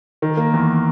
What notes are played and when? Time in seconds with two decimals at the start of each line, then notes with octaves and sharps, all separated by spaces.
0.22 D#3
0.37 A#3
0.54 E2